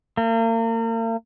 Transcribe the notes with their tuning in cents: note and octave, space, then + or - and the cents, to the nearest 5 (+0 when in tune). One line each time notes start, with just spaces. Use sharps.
A#3 -40